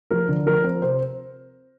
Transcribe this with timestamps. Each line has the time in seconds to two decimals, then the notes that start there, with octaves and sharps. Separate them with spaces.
0.11 F3 A#4
0.28 D3
0.46 F3 A#4
0.64 C4
0.82 C3 C5